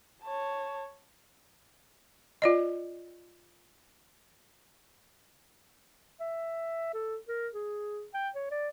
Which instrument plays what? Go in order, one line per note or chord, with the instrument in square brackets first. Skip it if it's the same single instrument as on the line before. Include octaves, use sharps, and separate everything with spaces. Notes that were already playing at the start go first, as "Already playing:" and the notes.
[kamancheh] C#5 A5
[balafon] F4 D5 D#5
[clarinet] E5
A4
A#4
G#4
G5
C#5
D5